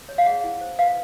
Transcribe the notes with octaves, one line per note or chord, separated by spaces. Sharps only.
C#5
F5
G#4 F#5
E4
C5
B4 F5